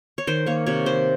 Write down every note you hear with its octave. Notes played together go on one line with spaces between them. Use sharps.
C#5
D#3 C5
A#3 C#5
C3 C#5
D#3 C5